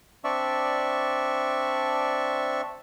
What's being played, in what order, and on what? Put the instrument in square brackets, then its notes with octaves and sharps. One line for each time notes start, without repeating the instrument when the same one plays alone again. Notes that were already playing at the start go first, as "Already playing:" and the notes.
[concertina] C4 D4 D5 E5 C#6